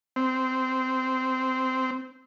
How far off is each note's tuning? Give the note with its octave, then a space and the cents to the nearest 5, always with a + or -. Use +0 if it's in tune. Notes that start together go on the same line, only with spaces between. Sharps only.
C4 -15